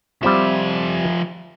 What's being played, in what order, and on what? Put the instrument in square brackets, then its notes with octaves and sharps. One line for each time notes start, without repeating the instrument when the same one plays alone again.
[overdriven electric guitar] F3 E5 [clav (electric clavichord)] G3 C4 F4